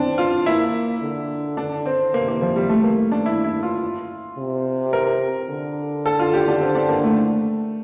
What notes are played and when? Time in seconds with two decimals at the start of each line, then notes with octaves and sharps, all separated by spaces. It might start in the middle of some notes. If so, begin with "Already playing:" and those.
Already playing: C4 D4
0.18 F4
0.46 A#3 E4
1.02 D3
1.57 D4
1.86 C4
2.14 C3 A#3
2.28 A#3
2.42 F3
2.56 G3
2.69 A3
2.84 A#3
3.12 D4
3.26 E4
3.44 E4
3.63 F4
4.38 C3
4.93 A#4
5.50 D3
6.06 A4
6.19 F4
6.34 G4
6.48 D4
6.61 C4
6.75 D4
6.89 A#3
7.04 A3